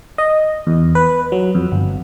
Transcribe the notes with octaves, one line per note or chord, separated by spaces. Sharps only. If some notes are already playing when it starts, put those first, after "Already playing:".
D#5
E2
B4
F#3
F2
G1